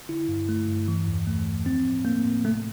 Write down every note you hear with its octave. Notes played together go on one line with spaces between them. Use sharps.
D3 E4
G2
A3
G2
E3
E2
A3
E2
F3 C4
A2
A3 A#3
A2
C3 A3